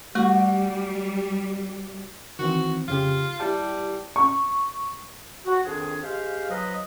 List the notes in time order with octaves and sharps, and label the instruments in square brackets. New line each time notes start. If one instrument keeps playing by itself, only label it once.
[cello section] G3 [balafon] A3 [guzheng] F#4
[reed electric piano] D#3 E3 C4 [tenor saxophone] F#4
[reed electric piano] F2 C#3 G4 [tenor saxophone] F4
[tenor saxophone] G3 [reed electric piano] E4 G4 A5
[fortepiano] C#6
[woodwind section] F#4
F2 D#3 D4 G#4
G#3 G4 C5 F5
F3 F#3 B4 D#5